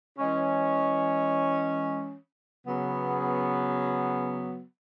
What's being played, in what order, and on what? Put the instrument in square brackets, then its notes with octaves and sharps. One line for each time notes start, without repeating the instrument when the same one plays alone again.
[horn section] E3 G#3 C#4
C#3 F#3 B3